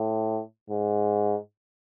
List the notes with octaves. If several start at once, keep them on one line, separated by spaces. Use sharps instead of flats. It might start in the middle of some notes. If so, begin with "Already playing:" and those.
Already playing: A2
G#2